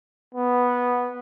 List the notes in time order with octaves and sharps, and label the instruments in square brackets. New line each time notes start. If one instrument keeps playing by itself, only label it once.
[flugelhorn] B3